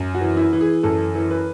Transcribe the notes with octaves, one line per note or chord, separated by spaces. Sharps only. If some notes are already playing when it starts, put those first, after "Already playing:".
Already playing: F#2
F#4
E3
E4
E3
G#4
F#2 A4
E3
B4